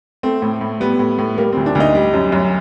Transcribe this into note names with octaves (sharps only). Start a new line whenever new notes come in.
A3 C4
A2
A2
G3 B3
A2
A2
G3 A#3
D2 C4
D4
D2
D#4
G3
F#2
F#2